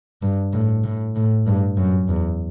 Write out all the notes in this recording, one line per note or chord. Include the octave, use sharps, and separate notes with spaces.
G2
A2
A2
A2
G2
F#2
E2